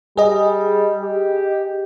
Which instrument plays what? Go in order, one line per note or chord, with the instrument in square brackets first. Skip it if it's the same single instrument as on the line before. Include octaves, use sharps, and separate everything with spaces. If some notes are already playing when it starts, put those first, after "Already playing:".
[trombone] G3 [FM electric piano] G#4 D#5
[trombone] G4